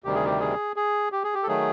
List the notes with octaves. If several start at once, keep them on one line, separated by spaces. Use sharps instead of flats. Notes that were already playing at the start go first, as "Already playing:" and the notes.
D2 C3 D#3 G3 G4
G#4
G4
G#4
G#4
G4
G#4
G4
A4
D#3 F#3 A3 G#4